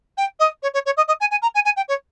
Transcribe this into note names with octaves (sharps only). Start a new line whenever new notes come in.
G5
D#5
C#5
C#5
C#5
D#5
D#5
G#5
G#5
A#5
G#5
G#5
G5
C#5